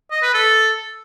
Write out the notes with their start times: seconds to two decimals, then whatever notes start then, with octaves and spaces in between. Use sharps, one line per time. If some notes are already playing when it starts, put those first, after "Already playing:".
0.11 D#5
0.23 B4
0.34 A4